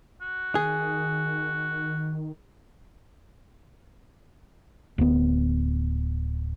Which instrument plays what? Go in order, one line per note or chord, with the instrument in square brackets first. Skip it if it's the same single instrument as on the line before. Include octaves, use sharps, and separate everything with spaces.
[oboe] F#4
[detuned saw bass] D#3 [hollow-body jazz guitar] G#4
[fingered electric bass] D1 B3